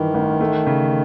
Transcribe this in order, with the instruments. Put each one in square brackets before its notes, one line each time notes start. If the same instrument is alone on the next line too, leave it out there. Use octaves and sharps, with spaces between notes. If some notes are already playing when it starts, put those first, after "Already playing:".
Already playing: [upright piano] G2 E3 [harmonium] D#3
[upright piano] A1
A3
C#3